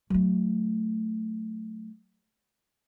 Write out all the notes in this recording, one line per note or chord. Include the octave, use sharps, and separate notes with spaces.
F#3 A3